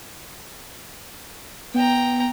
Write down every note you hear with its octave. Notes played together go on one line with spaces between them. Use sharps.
B3 G5 A#5